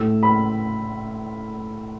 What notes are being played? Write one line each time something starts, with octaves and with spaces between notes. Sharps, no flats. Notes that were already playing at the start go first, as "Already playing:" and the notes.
Already playing: A2 A3 E6
B5